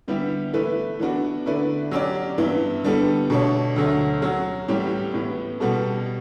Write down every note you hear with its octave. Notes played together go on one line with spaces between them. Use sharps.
D3 G3 B3 E4 G4
E3 A3 E4 B4
E3 B3 D4 F#4
D3 A3 E4 B4 D5
F#3 C#4 G4 D5
G2 E3 B3 E4
D3 G3 B3 D4 A4
B2 A3 D4 A4 C#5
D2 D3 F#3 A3
F#3 C#4 F#4
A2 E3 G3 C#4 G4
A2 E3 B3
B2 G3 B3 F#4 A4